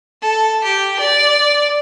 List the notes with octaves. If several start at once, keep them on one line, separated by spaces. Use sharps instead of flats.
A4
G4
D5